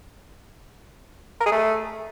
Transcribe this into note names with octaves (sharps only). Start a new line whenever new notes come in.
A#4
G#4
A3